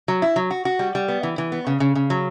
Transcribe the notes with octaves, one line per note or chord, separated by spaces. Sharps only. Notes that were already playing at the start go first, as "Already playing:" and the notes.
F#3
E4
F#3
F#4
F#4
G3
G3
B3
E3
E3
B3
C#3
C#3
C#3
F#3